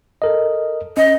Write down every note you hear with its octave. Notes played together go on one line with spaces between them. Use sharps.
A4 A#4 D#5
C#4 D#5